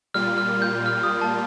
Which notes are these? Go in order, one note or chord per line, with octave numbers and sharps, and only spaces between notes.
A#2 G3 A#3 F4 F6
F6
G6
F6
D#6
A5